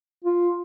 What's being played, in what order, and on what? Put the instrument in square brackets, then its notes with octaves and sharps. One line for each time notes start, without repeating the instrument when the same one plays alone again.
[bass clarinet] F4